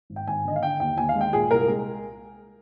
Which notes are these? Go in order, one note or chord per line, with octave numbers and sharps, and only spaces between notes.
G#1
G5
G#1 G#5
D3 D#5
F5
D3 G5
D#2 G5
D#2 G#5
F5
G#3
G5
A#2 G#4
C2 A#4
G#3 G#4